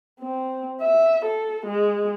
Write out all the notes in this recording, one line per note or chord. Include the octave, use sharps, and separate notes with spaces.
C4
E5
A4
G#3